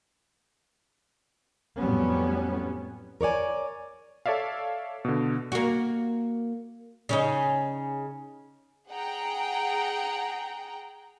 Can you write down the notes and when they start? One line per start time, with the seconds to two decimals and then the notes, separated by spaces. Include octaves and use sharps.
1.79 F2 A2 F#3 G3 B3 C#4
3.21 A#4 C#5 D5 G#5
4.26 A4 C#5 D5 E5 F5
5.05 B2 D3
5.52 A#3 F#4
7.09 C#3 C#4 D#4
8.90 G#4 F#5 G5 A#5